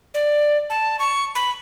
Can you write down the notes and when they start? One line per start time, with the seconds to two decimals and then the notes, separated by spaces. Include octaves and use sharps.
0.14 D5
0.70 A5
0.99 C#6
1.35 B5